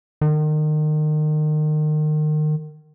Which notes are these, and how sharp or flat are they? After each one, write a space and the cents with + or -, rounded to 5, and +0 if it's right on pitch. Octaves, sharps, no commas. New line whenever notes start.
D#3 -30